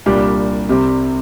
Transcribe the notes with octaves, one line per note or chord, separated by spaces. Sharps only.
C2 A#2 G3 D4 G4
C2 C3 G3 C4 G4